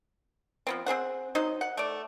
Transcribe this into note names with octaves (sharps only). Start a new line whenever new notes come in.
F3 B3 C4
C4 G#4 C5 F#5
F#3 D#4 C5 D#5
F#5
A3 D5